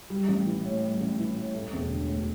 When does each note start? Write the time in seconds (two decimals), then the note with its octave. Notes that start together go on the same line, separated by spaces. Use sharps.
0.10 G3
0.28 A1
0.46 E3
0.64 A2
0.83 G3
1.01 A1
1.19 E3
1.36 A2
1.54 A3
1.73 E1
1.90 D3
2.09 D2